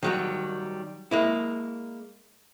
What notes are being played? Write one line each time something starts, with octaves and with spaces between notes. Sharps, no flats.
D#3 F#3 G3
G#3 A#3 E4